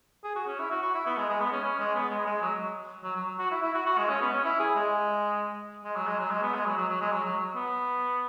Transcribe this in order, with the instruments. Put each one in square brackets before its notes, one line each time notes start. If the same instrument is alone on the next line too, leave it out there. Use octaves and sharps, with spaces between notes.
[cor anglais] G#4
F#4
C#4
E4
F#4
F#4
E4
B3
G#3
G#3
B3
C#4
C#4
G#3
B3
G#3
G#3
F#3
F#3
F#3
F#4
E4
E4
F#4
F#4
G#3
C#4
B3
C#4
E4
G#4
G#3
G#3
F#3
G#3
F#3
G#3
B3
G#3
F#3
F#3
F#3
G#3
F#3
F#3
B3